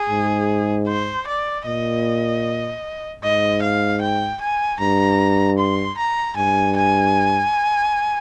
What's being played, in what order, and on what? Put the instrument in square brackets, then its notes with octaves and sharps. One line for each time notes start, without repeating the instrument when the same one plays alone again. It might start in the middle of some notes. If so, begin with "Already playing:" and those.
Already playing: [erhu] G#4
[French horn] G#2
[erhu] C5
D5
[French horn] A#2 [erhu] D#5
[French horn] G#2 [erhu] D#5
[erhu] F5
G5
G#5
[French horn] G2 [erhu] A#5
[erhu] C6
A#5
[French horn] G2 [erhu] G#5
[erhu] G#5